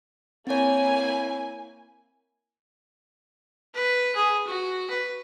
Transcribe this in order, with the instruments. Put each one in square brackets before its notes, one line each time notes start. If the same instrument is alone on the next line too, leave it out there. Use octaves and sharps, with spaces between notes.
[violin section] A#3 E4 G#5 [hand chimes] C4 C#5
[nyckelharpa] B4
G#4
F#4
B4